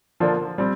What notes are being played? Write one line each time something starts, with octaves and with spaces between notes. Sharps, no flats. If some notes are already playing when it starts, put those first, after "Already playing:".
D3 F3 A#3 D4 F4
G3 C4